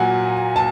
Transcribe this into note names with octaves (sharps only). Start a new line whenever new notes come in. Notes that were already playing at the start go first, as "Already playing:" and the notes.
Already playing: A#2 F#3 F#5 G#5
A5